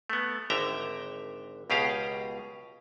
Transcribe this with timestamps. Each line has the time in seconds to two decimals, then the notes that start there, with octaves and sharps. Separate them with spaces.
0.10 A3 B3
0.50 G#1 D3 E5 G5 A#5
1.70 C#2 B2 G4 G#4 F5 A#5